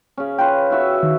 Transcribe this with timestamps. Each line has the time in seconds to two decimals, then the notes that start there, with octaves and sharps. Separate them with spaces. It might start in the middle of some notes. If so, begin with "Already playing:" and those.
0.17 C#3 C#4
0.39 F4 B4 G5
0.71 E4 F#4 E5
1.03 D#3